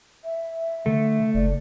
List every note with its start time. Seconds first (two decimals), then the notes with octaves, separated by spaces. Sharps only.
0.24 E5
0.86 D3 A3
1.34 F#1 D5